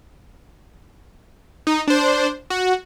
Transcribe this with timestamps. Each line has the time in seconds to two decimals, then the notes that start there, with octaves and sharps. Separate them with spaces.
1.67 D#4
1.88 D4 C5
2.50 F#4